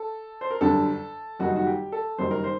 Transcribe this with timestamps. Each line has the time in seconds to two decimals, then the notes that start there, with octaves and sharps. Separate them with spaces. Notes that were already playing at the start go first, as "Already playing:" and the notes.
Already playing: A4
0.41 C5
0.51 A#4
0.61 G1 F#2 D3 G3 A4
1.39 F#1 F#2 D#3 G3 F#4
1.48 D#4
1.56 F#4
1.67 G4
1.92 A4
2.18 F#1 F#2 D#3 G3 C5
2.31 A#4
2.44 C5